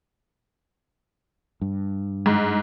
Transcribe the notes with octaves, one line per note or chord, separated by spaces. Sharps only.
G2
G#2